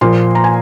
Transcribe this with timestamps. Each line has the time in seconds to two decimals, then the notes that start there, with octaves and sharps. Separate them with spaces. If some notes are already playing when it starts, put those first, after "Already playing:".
0.01 A#2 F3 A#3 C6
0.35 A#5
0.44 G#5